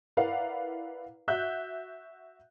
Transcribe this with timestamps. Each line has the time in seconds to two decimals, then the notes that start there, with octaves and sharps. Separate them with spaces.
0.17 E4 A#4 B4 D5 F5 F#5
1.28 F#4 E5 F#6 G6